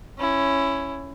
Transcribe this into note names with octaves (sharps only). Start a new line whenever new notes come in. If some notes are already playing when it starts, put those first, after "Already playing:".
C#4 E4